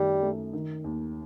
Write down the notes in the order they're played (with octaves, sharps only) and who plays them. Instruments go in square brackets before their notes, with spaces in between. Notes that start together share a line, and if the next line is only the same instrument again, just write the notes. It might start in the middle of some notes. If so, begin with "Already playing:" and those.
Already playing: [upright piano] F#2 D#3 A3 [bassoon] G3
[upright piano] A3
D#3
D#2